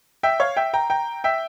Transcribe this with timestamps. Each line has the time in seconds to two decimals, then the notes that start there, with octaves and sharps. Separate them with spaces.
0.23 E5 G5
0.40 C#5 F5
0.57 E5 G5
0.73 G5 A#5
0.90 G5 A#5
1.24 E5 G5